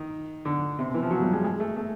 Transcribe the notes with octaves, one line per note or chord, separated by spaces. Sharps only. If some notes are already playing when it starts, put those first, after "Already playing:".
Already playing: D#3
D3
C3
B2
E3
F3
F#3
G3
G#3
G#3
A3
A3